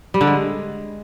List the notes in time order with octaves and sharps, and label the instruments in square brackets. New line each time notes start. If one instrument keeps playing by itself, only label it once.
[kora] G3
D3
G#3